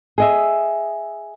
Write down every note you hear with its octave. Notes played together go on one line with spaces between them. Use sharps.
G#4 D#5 E5